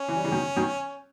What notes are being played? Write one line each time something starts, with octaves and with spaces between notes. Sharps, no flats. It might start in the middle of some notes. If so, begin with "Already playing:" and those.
Already playing: C#4
E3
G3
C#3 E3
B2 D#3
B2 D#3